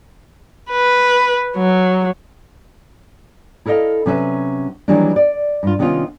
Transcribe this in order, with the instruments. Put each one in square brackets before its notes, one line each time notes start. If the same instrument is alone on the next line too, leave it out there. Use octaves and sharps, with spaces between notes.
[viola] B4
F#3
[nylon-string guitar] E4 A4 A#4 C#5 D#5 F5
C3 F#3 C#4 F#4 B4 E5
D#3 E3 F#3 G3 A#3 D4
D5
G2 F4
C3 D#3 B3 C#4 F4